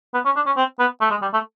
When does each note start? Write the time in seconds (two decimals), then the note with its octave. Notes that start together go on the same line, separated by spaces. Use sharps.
0.14 B3
0.25 C#4
0.36 D4
0.46 C#4
0.57 C4
0.79 B3
1.01 A3
1.11 G#3
1.22 G3
1.34 A3